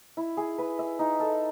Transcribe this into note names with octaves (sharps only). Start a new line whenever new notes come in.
E4
G#4
B4
E5
D#4
A4